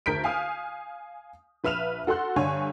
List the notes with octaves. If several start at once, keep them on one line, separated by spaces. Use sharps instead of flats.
D2 A#4 G6 B6 D7
F5 G#5 D#6 F6
A#1 B4 E5 F6 E7 F7
F#4 A4 F#5 C6 F#6
G2 D3 C#5 G#5